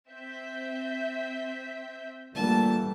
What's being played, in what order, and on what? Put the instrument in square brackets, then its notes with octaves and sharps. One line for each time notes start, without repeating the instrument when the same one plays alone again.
[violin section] C4 E5 G6
[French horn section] A#2 D3 A#3 [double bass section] E3 G3 A3 [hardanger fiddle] A5